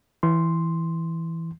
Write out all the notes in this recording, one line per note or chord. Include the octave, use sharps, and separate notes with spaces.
E3 C6